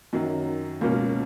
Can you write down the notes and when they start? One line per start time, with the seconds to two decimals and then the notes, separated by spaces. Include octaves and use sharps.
0.13 F#2 D#3 F#3
0.81 C#2 B2 A#3 C#4